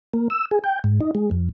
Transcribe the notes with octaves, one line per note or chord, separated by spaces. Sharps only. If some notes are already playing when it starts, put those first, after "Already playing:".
A#3
E6
G#4
G5
G#2
D#4
G#3
F2